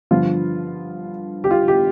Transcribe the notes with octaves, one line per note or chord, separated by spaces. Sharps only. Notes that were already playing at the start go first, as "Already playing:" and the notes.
G2 D3 F3 F4
G4
F4
G4